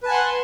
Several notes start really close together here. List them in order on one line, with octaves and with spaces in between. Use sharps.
B4 A5 G#5 F#5 C6